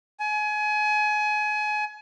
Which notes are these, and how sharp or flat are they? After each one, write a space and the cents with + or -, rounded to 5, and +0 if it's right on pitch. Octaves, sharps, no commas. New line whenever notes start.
G#5 +25